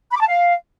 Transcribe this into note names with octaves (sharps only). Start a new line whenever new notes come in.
B5
D6
A5
F5